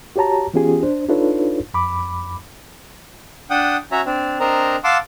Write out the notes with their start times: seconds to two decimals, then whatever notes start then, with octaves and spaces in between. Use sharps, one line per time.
0.16 F#4 G4 C#5 A5 A#5
0.54 E3 B3 C#4 F4 G4 G#4
0.83 D4 C5
1.08 D4 D#4 F4 A4 B4 C#5
1.74 F2 B5 D6
3.50 D4 F#5 G5 D#6
3.92 C#4 F#4 C#5 E5 A#5
4.06 C4 D4
4.40 C4 D4 A#4 C5 D#5 A#5
4.84 F5 F#5 A5 C6 D6 E6